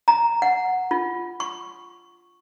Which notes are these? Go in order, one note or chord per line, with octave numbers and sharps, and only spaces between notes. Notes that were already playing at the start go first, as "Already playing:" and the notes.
A#5
F#5
F4
C#6